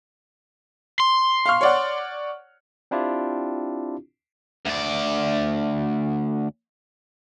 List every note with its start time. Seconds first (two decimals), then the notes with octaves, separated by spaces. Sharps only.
1.00 C6
1.46 F5 C#6 F6
1.61 C#5 D5 F#5
2.91 C4 D4 E4 F4 G4
4.66 D2 D5